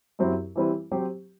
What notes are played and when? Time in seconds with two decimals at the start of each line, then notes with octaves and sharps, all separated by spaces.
0.19 F#2 F#3 C4 E4 G4
0.56 E3 G3 C4 E4 B4
0.91 F#3 C4 G4 C5